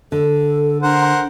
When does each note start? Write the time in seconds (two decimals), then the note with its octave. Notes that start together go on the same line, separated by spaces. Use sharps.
0.12 D3 A4
0.83 D4 A#4 C5 F#5